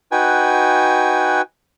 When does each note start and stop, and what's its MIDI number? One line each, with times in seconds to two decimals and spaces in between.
0.12 1.42 63
0.12 1.42 66
0.12 1.42 71
0.12 1.42 79
0.12 1.42 80